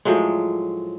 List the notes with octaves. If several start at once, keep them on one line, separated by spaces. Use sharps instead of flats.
A2 F3 F#3 G#3